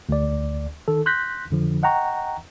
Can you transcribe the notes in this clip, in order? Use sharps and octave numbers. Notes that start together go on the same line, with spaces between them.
D2 D5
D#3 A4
C6 F#6 G6 A#6 B6
F2 D3 F3
D#5 F#5 G5 A#5 C#6